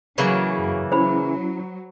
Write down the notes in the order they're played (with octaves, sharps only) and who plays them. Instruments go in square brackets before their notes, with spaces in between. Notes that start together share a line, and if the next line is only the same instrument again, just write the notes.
[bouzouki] C#3 E3 A#3 [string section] F#3
[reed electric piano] F#2
[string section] F#3 [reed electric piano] C#4 E4 [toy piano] C5 B5